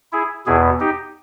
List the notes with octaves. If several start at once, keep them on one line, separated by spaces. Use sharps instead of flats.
E4 G#4
E2 B2 E4 G#4
D#4 G4